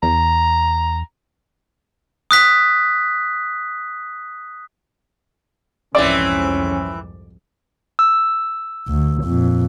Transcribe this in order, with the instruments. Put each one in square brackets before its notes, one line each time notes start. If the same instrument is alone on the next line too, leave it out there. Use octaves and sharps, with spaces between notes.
[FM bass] E2 [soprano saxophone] A#5
[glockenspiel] D#6 F#6 B6
[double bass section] C2 F2 G#2 [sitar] E3 C4 [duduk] C#4 [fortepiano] D5
[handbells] E6
[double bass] D2
F2 A#2